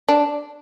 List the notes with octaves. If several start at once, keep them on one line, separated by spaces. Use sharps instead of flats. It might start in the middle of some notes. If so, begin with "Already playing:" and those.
D4